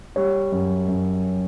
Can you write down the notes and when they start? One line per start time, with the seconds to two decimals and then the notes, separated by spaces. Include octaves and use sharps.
0.16 G3 C#5
0.52 F#2
0.88 F#2